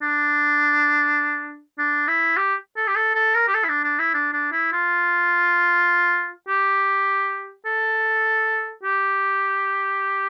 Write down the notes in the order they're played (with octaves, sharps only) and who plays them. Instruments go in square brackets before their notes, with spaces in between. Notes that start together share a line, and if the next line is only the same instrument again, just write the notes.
[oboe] D4
D4
E4
G4
A4
G4
A4
A4
A#4
G4
A4
E4
D4
D4
E4
D4
D4
E4
F4
G4
A4
G4